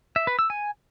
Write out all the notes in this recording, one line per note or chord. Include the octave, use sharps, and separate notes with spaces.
E5
B4
E6
G#5